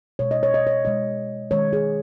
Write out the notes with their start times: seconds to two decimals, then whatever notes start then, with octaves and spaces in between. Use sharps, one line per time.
0.19 B2 G#3 C#5
0.31 D#5
0.43 C#5
0.54 D#5
0.67 C#5
0.85 B2 G#3 D#5
1.51 D#3 G#3 C#5
1.73 G#4